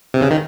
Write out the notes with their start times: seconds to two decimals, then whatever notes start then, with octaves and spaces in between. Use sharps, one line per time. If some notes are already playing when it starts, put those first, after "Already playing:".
0.14 C3
0.22 C#3
0.31 D#3